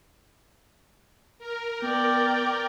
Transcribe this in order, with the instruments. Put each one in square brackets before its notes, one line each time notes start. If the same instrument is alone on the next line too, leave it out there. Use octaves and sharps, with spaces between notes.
[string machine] A#4
[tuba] B3 [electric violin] D5 G5